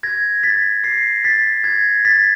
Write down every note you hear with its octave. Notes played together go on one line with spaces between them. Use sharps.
G#6 A#6
A6 B6
A#6 C7
A6 B6
G#6 A#6
A6 B6